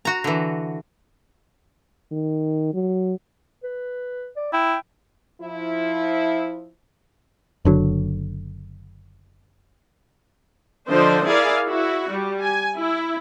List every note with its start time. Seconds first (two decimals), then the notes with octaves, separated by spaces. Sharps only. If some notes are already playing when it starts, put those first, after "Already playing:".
0.05 F#4 A#5
0.24 D3 E3
2.12 D#3
2.74 F#3
3.63 B4
4.37 D5
4.53 E4 G5
5.42 F3 E4
7.65 F#1 D3 F#3
10.89 D3 F3 D4 C5 D#5
11.26 E4 G#4 A#4 D5 F5
11.68 E4 F#4
12.12 G3
12.44 G#5
12.77 E4